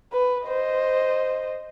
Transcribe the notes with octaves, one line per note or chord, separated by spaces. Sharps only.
B4
C5 D#5